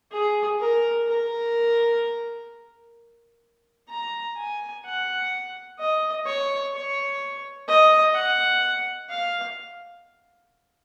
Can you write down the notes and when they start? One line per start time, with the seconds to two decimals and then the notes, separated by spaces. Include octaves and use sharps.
0.12 G#4
0.60 A#4
1.07 A#4
3.89 A#5
4.37 G#5
4.85 F#5
5.79 D#5
6.26 C#5
6.73 C#5
7.68 D#5
8.14 F#5
9.09 F5